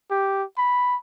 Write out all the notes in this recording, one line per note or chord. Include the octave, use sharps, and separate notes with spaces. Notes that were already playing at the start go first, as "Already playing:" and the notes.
G4
B5